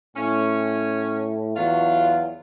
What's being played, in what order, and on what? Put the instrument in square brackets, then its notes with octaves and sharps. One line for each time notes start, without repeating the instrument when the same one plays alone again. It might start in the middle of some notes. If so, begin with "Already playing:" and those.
[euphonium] A2 [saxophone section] C#4
[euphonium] E2 [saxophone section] F#3 F4